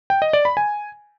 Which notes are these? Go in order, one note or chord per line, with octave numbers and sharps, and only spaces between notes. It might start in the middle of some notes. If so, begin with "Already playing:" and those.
G5
D#5
D5
B5
G#5